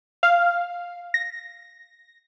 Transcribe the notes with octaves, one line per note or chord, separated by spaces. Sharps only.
F5
A#6